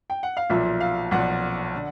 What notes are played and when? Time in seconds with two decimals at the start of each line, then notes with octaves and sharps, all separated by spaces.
0.10 G5
0.23 F#5
0.37 F5
0.50 B1 A#2 F3 E5
0.80 F5
1.11 B1 A#2 F3 F#5
1.76 D3